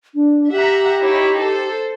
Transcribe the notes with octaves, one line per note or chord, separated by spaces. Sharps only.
D4
G4 E5 F#5 A#5
D#4 E4 C#5
A4 C5